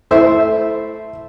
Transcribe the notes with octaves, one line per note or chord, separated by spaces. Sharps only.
A3 E4 C5 E5